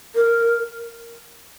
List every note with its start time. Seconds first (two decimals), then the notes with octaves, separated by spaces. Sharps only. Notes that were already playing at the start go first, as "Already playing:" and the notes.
0.15 A#4